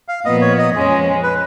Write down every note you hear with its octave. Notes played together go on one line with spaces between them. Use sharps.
F5
A#2 F3 B3 D#5
C#5
D#5
F2 F3 G#3 C#4
B4